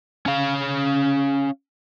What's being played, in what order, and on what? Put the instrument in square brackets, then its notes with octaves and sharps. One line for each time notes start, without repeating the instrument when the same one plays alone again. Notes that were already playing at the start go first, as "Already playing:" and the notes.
[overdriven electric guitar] C#4 F5